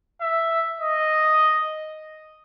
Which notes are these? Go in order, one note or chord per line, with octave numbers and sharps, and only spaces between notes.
E5
D#5